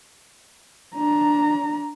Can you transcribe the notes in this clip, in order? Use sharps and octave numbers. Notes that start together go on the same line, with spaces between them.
D4 A#5